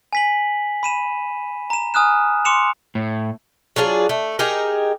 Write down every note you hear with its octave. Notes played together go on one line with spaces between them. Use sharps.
G#5 B6 F#7
B5 D#7 E7
A#5 E7
G#5 D#6 F6 F#6 E7
C6 D6 C#7 E7 F7
A2
F#3 D4 F4 G#4
A3
D#4 G4 G#4 A#4